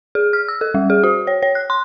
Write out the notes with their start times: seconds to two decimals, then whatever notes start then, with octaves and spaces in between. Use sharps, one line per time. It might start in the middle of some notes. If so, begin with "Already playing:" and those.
0.15 G#4
0.33 F6
0.48 E6
0.61 A4
0.74 G3
0.90 G#4
1.04 F#4
1.27 C#5
1.42 C#5
1.55 F#6
1.70 C6